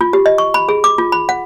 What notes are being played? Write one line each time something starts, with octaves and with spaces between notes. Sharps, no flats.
F4
G4
D#5
C#6
B5
G#4
D6
F4
B5
F#5